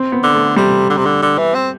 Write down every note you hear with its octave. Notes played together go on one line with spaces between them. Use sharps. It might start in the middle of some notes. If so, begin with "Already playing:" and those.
Already playing: C4
B3
D3
A3
C3 G3
D3
C3
D3
D3
E3
C4